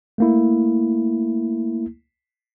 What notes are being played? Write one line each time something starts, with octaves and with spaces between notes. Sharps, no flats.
A3 A#3 E4